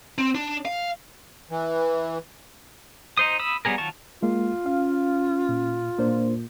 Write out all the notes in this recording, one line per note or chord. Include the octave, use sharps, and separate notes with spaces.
C4
D4
F5
E3
D#4 C5 D#6
B5 D#6 E6
F#3 G3 B3 G#4 A#4
D#3 F#3 F4 A5 C#6
G#3 A#3 F4
C#4 F5
A#2
A#2 A#3 D4 C5